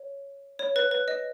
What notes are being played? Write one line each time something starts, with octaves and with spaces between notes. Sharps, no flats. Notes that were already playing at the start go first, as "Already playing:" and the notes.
Already playing: C#5
C#5
B4
B4
D#5